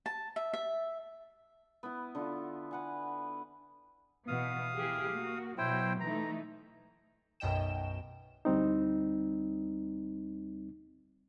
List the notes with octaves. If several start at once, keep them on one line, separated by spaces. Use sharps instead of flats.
A5
E5
E5
B3 E4
D3 E4 F4
B4 F#5 G#5
B2 E3 B3 F5 D#6
E3 G4 G#4
A#3 F#4
B2 F#3 E4 C5 G5
E3 A3 D#4 A#5
B1 F#2 B2 D#5 G5 E7
D2 G3 C4 D#4